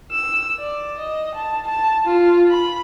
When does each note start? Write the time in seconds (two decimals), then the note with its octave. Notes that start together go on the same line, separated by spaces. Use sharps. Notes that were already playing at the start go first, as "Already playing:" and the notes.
0.11 E6
0.58 D5
0.98 D#5
1.35 A5
1.67 A5
2.05 F4
2.50 B5